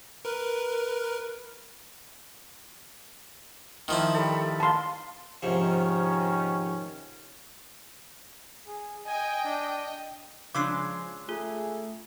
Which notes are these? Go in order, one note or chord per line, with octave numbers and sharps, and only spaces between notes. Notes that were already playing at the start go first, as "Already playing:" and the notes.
A#4 B4
D#3 F3 E4
G3 A3 A4
F5 A5 A#5 C6
G#2 C3 D#3 F3 C#4
G#4
D#5 G5 G#5
D4
C#3 F3 G#3 D4 D6 E6 C7
A3 F4 G#4